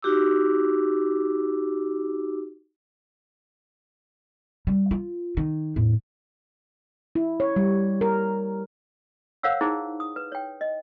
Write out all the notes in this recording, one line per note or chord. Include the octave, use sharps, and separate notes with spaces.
D#4 F#4 G4 D6 E6
G3
F4
D#3
E2 A2
E4
C#5
G3
A#4
A#4 C5 C#5 F5 F#5 E6
D#4 E4 G#4 C5
D#6
B4
C#5 G5
D#5